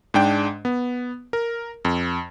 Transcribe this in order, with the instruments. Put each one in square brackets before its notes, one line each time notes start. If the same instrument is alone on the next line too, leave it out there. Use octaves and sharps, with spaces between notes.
[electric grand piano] G#2 G#3 D4 G5
B3
A#4
F2